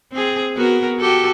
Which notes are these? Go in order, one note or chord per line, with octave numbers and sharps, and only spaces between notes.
C4 G#4
B3 F#4 A#4
F#4 G4 A4